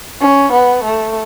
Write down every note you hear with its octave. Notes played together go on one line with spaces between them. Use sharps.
C#4
B3
A3